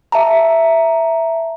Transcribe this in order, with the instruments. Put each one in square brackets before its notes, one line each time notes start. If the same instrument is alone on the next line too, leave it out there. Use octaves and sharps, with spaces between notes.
[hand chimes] E5 A5 A#5